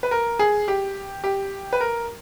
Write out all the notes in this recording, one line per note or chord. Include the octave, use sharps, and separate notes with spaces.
B4
A#4
G#4
G4
G4
B4
A#4